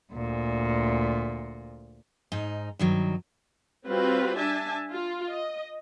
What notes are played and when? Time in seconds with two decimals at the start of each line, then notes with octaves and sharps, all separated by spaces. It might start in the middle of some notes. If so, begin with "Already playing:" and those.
0.12 D2 A#2
2.32 G#2 D#4
2.79 G2 D#3 F#3
3.87 G3 C4 F4 F#4 B4
4.38 D4 E5 G#5 A5
4.91 F4
5.29 D#5